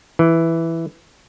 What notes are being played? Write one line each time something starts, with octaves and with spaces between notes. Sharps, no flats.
E3